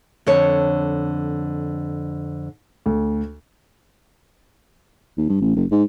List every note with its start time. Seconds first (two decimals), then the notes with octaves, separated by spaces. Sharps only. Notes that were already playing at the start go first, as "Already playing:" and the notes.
0.26 F2 D3 C#5
2.86 D2
5.17 D#2
5.29 G2
5.41 A1
5.56 F#1
5.71 G#2